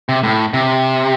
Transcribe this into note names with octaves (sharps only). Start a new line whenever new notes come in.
C3
A2
C3